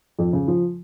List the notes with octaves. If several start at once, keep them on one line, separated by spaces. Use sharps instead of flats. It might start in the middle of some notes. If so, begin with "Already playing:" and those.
F2
C#3
F3